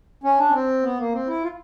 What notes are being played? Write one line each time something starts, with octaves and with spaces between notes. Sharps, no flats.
C#4
D4
C#4
C4
B3
A#3
C4
E4
F4